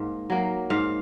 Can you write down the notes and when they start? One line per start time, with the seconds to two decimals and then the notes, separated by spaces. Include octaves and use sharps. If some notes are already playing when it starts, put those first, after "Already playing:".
Already playing: G#2 A#3
0.30 F#3 A#3
0.70 G#2 F5